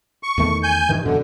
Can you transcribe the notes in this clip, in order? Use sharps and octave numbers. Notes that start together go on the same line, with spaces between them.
C#6
E2 D#3 A3
G#5 G6
G2 D#3 E3
F#2 B2 D3